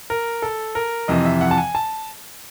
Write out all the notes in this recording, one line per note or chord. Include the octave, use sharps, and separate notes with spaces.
A#4
A4
A#4
F2 C3 E3 D#5
E5
F#5
A5
G#5
A5